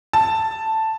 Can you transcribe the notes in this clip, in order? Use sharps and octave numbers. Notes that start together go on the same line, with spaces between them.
A5